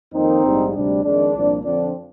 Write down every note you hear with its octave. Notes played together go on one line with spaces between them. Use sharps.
F2 D#3 A#3 C4 D#4
A#1 G#2 G3
D2 C3 G3 D4
F2 D#3 G#3 D4
C2 A#2 F3 A#3
F2 D3 F3 C4 D4